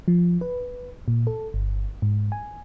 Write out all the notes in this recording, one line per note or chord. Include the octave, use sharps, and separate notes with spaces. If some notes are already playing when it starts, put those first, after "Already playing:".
F3
B4
A#2
A4
G1
G#2
G#5